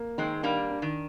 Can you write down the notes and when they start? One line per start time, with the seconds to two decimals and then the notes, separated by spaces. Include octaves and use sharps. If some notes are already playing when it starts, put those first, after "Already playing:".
Already playing: A#3
0.18 D#3 G#3 C4
0.43 G3 A#3 D4
0.70 D4
0.82 D#3